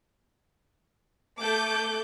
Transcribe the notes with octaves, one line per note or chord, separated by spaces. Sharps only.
A3 A4 D6 G6